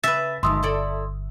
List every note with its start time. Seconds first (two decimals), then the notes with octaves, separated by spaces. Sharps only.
0.04 C#3 B4 E5 A6
0.43 G1 D#3 F3 G#3 C6 D#6 E6
0.63 E4 A4 D5